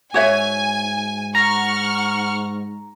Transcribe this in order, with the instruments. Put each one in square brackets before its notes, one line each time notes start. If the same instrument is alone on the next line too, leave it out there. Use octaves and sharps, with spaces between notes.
[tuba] G#2 [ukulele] F#4 C#5 E5 [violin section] G#5
[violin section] F#5 C#6 F6 [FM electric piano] A#5